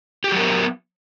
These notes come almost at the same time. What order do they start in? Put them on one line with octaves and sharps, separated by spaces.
G4 F#4 F#3 A#4 B3